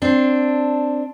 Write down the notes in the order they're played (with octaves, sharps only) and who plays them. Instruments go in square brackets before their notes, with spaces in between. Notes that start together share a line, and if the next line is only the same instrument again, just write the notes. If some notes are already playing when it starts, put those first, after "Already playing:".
[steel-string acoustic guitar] C4 D4